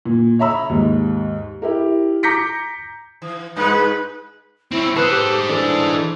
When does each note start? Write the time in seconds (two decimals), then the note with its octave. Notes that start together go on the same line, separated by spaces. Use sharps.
0.05 A#2
0.39 C#5 E5 A#5 B5 E6
0.69 D#2 G#2
1.62 E4 G4 A#4
2.23 A#5 D6 G6 A#6 B6 C#7
3.22 E3
3.56 G2 G#3 D#4 B4
4.71 C4 C#4 E4
4.96 G#4 A4 B4 C5
5.11 G4
5.49 E3 D4 A4